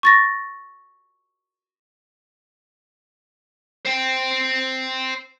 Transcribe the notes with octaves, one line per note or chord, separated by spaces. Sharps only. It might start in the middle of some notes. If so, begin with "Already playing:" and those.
C#6 A6 A#6
C5 G5